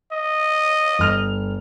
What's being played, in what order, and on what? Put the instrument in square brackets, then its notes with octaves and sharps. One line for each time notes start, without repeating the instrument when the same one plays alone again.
[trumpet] D#5
[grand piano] G1 F6 F7